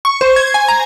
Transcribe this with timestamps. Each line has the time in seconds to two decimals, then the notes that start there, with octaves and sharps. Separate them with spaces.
0.05 C#6
0.21 C5
0.36 G#6
0.54 G#5
0.68 A#5